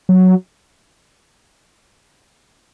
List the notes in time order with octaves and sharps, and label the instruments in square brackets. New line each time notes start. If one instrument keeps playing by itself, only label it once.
[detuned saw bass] F#3